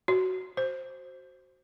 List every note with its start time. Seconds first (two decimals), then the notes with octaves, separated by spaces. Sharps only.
0.08 F#4
0.57 C5